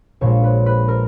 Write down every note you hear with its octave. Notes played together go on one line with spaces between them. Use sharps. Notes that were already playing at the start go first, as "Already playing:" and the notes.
A#1 A#2 G#3 C#5
B4
B4
A#4